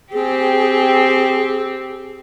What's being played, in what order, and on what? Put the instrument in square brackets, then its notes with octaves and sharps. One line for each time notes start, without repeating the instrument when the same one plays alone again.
[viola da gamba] C4 G4 [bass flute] G#4